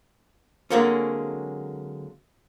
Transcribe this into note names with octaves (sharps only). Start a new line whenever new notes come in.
D3 F#3 G#3 A#3 C4 C#4